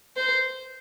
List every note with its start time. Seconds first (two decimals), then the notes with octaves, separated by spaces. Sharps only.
0.17 C5